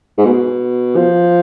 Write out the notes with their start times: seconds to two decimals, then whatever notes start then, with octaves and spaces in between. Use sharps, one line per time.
0.18 G#2
0.25 B2
0.96 F3